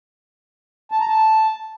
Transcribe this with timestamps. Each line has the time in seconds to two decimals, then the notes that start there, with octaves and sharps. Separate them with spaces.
0.91 A5
1.00 A#5
1.09 A5